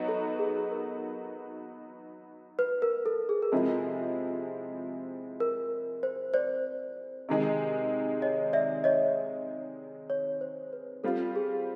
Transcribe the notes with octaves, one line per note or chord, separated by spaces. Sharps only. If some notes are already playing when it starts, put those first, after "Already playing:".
Already playing: F#3 B3 D#4 F#4
A4
G#4
A#4
B4
A#4
A4
G#4
A#4
C3 F3 G#3 C4 E4 A4
A#4
C5
C5 D5
C3 D#3 G#3
C#5 D#5
D5 E5
C#5 D#5
C#5
C5
B4
G3 C4 F4 A4
G#4